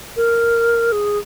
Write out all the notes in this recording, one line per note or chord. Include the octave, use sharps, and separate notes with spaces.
A#4
G#4